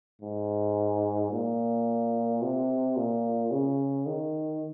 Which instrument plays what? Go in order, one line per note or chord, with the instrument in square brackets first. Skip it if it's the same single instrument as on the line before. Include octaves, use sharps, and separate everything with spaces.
[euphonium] G#2
A#2
C3
A#2
C#3
D#3